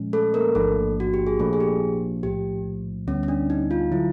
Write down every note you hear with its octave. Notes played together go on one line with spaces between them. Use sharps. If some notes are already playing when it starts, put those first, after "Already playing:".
Already playing: A#2 F3 G#3 C#4
A3 A4
A#3 A#4
A1 G#2 F3 A3 A#3 D4 A4
F#4
G4
G#4
A#2 F3 A3 A#3 D4 A4
G#4
G4
B1 A2 F3 A3 G4
D2 D3 G3 B3 C#4
C#4
D4
D#4
F4
D3 F#3 E4